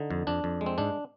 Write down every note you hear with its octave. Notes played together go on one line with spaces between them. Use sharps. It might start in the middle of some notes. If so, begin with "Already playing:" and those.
Already playing: D3 D#4
F2
F2 D4
F2
G#3
C4
G#2 D4